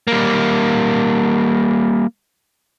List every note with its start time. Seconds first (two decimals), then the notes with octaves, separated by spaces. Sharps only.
0.07 G3 A#3